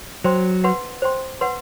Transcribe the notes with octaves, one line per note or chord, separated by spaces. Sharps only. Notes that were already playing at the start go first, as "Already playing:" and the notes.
F#3 C5 G5 C6
B4 F#5 C6
C5 G5 C6
B4 F#5 C6